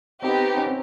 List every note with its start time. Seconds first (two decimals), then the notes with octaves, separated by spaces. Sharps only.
0.22 B3 C4 D#4 G4
0.57 C#4
0.67 C4